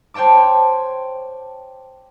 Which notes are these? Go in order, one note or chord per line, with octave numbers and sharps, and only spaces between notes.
C5 C#5 G5 A5 D6